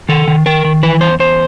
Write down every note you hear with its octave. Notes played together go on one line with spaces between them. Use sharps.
D#3 A4
D#3
D#3 A#4
D#3
E3 B4
E2 C5
E2 C5